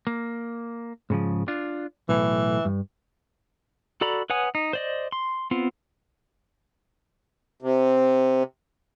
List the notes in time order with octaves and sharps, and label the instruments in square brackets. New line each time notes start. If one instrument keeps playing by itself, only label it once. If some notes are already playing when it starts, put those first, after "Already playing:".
[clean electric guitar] A#3
G#2 C#3 F3
D4 F4
[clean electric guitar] B1 A2 [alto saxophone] E3
[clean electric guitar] G2
[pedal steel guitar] F#4 A4 D5 A#5 B5
B4 C#5 F#5 G#5 D#6
D#4
C5 D5 D#5
C6
B3 C4 F4
[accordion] C3